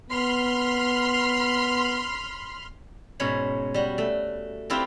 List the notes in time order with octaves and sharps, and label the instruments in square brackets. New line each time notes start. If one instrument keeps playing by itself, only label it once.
[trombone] B3 [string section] B5 C6 F6
[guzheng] G#2 B2 C#4 C#5 B5
G3 F#4
A3
C4 E4 F4 G4 B4